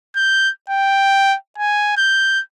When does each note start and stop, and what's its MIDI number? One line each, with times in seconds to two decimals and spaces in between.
0.16 0.51 91
0.70 1.36 79
1.58 1.96 80
1.97 2.42 91